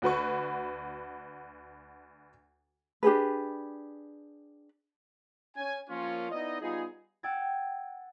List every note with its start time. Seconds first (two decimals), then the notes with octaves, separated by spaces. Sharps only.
0.02 D2 F#4 B4 C#6
3.03 D4 G4 G#4 B4
5.57 C#4 G#5
5.90 F3 A#3 C#4 F4
6.32 B3 D#4 E4 D5 D#5
6.61 G3 B3 D#4 F4 G#4
7.23 F#5 G5 E6 G#6 A6